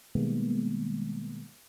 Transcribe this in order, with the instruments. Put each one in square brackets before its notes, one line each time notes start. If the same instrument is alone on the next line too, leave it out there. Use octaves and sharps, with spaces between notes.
[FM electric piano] B2 D#3 G3 G#3 A#3 B3